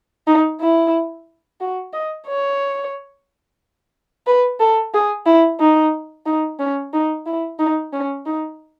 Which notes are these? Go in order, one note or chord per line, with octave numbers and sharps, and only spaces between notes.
D#4
E4
F#4
D#5
C#5
B4
A4
G#4
E4
D#4
D#4
C#4
D#4
E4
D#4
C#4
D#4